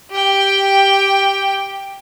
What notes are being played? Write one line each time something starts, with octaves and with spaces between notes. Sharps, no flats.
G4 G5